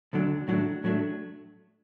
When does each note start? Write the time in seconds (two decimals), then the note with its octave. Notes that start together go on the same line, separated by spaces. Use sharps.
0.13 D2 D3 F#3 D4
0.48 A2 F#3 A3 D4
0.84 A2 F#3 A3 D4